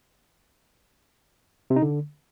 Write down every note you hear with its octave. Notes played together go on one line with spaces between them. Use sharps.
C3
D#4
D3